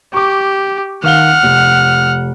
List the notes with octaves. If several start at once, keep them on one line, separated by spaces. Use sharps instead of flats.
G4 C#6 D6
D#3 F5 F#5 F6 G7
F1